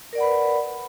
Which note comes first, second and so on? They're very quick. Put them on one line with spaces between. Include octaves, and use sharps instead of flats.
A#4 D5 F#5 B5 B4